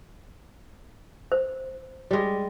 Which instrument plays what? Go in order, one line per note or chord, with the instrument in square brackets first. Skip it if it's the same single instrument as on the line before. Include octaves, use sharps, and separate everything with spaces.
[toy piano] C5
[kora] G3 G#3